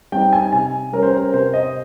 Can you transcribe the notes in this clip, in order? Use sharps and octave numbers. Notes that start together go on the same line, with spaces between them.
G3 C4 D#4 G5
G#5
C3 G#5
G3 C#4 A#4
C5
A#4
C3 C5
D#5